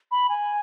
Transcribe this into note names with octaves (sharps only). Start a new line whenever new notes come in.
B5
G#5